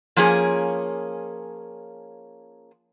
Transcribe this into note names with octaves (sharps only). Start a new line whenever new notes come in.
F3 A#3 C#4 G#4